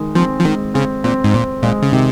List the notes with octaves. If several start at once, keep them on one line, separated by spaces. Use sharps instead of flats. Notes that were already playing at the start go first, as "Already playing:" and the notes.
Already playing: D#3 G#3
F3 C4
F3
D#3 G#3
C#3 C4
A#2 C4
G#2
A#2 C4
A#2 G#3
C#3
C3 D#3